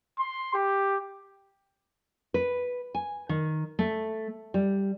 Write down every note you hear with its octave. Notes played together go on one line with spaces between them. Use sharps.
C6
G4
B4
G#5
D#3
A3
G3